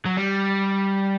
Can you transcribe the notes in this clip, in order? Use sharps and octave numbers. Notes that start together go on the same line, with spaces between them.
F#3
G3